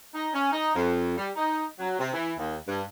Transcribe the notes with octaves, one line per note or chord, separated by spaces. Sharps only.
D#4
C#4
D#4
F2
G3
D#4
F#3
C3
E3
D#2
G2